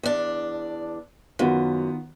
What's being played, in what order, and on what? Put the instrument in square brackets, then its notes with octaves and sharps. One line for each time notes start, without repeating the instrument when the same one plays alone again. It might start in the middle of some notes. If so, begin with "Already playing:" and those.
[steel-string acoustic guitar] E2 D4
[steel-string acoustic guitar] F#2 [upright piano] D#3 B3 F4